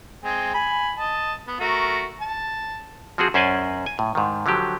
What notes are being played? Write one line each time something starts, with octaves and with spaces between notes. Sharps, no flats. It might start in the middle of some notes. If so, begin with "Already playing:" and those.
G#3 C4 G#5
G#5 B5
D#5 A5
B3
A3 F#4 A#4
A5
F3 C4 F#4 G#4
F#2 C#4 C5 D5 D#5 G#5
G#5
A2
G#2 D#3
D3 F3 F#3 G4